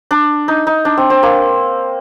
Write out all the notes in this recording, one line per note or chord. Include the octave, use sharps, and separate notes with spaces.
D4
D#4
D#4
D4
C4
C4
A#3